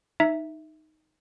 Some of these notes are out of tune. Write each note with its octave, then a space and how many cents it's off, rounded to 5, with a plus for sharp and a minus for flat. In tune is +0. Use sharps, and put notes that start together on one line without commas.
D#4 +0 E5 +0